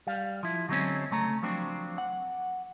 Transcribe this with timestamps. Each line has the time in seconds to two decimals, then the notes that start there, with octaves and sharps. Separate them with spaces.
0.07 G3 F5
0.43 F3 E4
0.69 D3 F#3 G#3 A3 C4 C#4
1.11 C#3 A3 A#5
1.42 F3 F#3 C4 D4
1.98 F#5